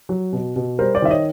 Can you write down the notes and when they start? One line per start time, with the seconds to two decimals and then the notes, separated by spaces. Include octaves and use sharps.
0.09 F#3
0.33 B2
0.56 B2
0.79 G3 A#4 C5
0.95 C5 D5
1.02 D#3 E5
1.10 C#5 D#5